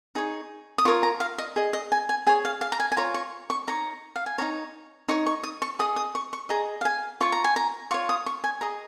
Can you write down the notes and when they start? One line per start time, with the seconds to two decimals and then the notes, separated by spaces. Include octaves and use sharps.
0.15 D#4 G#4 C#5
0.78 D#6
0.85 F4 A#4 C#5 C#6
1.03 A#5
1.20 F5
1.38 D#5
1.56 G#4 D#5
1.73 D#5
1.92 G#5
2.09 G#5
2.27 G#4 C#5 G#5
2.45 F5
2.61 F5
2.72 A#5
2.80 G#5
2.92 G#5
2.97 F4 C#5 A#5
3.14 C#6
3.50 C#6
3.67 D#4 C#5 A#5
4.16 F5
4.26 G#5
4.38 D#4 G#4 C#5 A#5
5.09 D#4 C#5 C#6
5.26 C#6
5.43 D#6
5.62 C#6
5.79 G#4 D#5 D#6
5.96 D#6
6.15 C#6
6.33 C#6
6.49 G#4 D#5 A#5
6.81 F5
6.85 G#5
7.21 F4 C#5 C#6
7.32 A#5
7.44 G#5
7.56 A#5
7.91 F4 C#5 C#6
8.09 D#6
8.26 C#6
8.44 G#5
8.61 G#4 D#5 A#5